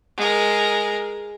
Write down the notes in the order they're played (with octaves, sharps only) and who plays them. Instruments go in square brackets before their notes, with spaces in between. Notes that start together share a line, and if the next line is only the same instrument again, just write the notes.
[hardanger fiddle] G#3 A#4